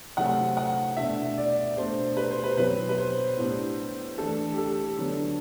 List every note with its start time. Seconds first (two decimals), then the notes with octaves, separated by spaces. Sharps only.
0.17 C3 F#3 A3 C4 F#5
0.57 F#5
0.97 B2 A3 D4 E5
1.38 D5
1.77 B2 A3 D4 C5
2.17 B4
2.31 C5
2.44 B4
2.57 B2 F#3 C4 B4
2.89 B4
2.98 C5
3.37 A2 G3 B3 D4
4.18 E3 A3 D4 A4
4.52 G4
4.58 A4
4.98 D3 F#3 B3 D4